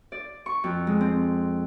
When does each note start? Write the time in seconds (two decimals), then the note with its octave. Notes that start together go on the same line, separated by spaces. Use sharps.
0.12 D5
0.46 C#6
0.64 F2
0.87 G#3
1.01 C4